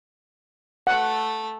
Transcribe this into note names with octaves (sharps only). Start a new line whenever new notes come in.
A3 A4 F#5